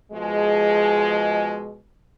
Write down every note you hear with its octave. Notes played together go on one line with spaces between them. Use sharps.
B2 F3 G#3